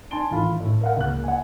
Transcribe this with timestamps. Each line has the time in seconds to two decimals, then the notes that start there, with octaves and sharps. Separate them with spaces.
0.11 D4 G#5 A5 C6 D7 G7
0.31 A1 D#3 A3 F4 B5
0.60 A2
0.81 A#4 F5 F#5
0.97 C#2 A#3 F#6
1.24 F#5 G#5